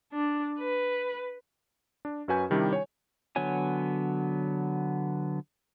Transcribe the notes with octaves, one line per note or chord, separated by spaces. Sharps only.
D4
B4
D4
F#2 C#4 F#4 B4 G#5 G6
C3 D#3 G3 D4 E4 G4
C#5 G#5
D3 F#3 B3 C#5 G#5